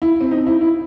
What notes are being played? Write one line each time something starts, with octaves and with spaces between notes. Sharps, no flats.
E4
C4
D#4
E4
E4